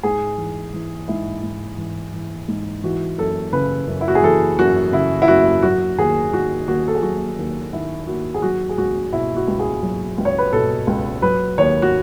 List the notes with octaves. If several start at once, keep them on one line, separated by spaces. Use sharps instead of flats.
G#2 G#4
E3
E3
G#2 E4
G#2
E3
E3
G#2
E3 F#4
F#2 A4
C#3 B4
F#2
E4
F#4
G#4
E3 A4
F#2 F#4
C#3 E4
E4
F#2 F#4
F#3 F#4
D#2 G#4
D#3 F#4
D#2 F#4
A4
G#4
F#3 F#4
D#2
D#3 E4
D#2 F#4
G#4
F#3 F#4
G#4
C#2 F#4
B2 E4
F#4
C#2
G#4
F#3
C#2
C#5
B4
B2 A4
C#2
F#3 B4
D#2 C#5
F#4